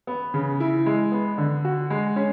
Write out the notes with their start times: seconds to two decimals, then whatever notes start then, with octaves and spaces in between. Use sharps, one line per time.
0.07 B3
0.34 C#3
0.60 E4
0.86 G#3
1.12 B3
1.38 D3
1.65 F#4
1.90 G#3
2.16 C#4